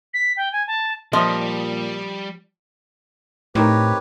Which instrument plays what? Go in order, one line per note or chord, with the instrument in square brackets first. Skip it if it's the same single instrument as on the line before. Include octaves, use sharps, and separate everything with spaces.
[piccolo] B6
G5
G#5
A5
[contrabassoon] A#2 [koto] F3 [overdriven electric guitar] G3 [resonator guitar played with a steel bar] D#5
[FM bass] A2 [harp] C4 D#4 A#4 [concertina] G4 B4 C#5